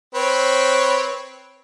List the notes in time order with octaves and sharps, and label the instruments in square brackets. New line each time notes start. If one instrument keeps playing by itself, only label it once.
[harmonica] C4 B4 C#5